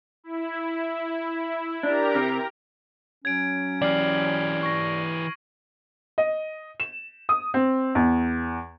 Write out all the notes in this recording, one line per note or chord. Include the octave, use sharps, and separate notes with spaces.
E4
D4 G4 A#4 A#5
C3
F#3 C#4 G#6 D7
E3 G4 D5 F6 C7 F#7
C#6 A#6
D#5
E7
D#6
C4
E2